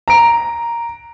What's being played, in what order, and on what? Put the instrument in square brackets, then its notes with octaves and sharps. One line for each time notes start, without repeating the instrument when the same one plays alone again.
[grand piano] A#5 D7